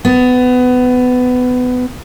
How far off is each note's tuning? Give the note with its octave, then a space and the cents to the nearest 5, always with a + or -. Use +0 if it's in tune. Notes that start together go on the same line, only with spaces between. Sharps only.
B3 +20